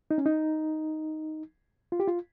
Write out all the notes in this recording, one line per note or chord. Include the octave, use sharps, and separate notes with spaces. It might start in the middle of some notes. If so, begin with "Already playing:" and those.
D#4
C#4
D#4
F4
G4
F4